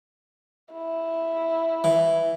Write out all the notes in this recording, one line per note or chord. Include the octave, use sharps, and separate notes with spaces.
E4
E3